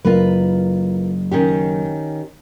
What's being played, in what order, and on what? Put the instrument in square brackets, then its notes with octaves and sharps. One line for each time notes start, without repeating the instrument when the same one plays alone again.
[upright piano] F#1 [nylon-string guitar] F4 A#4 B4
[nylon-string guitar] D#3 C#4 G4